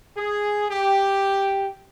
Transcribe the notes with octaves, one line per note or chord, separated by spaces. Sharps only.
G#4
G4